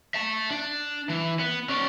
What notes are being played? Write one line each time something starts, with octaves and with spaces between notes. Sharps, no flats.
E5 A5
D4
E3
B3
C#4 D5